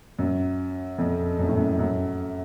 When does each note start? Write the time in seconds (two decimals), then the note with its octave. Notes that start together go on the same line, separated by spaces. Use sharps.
0.19 F#2
0.98 F2
1.39 F#2
1.48 A2
1.57 F#2
1.79 F#2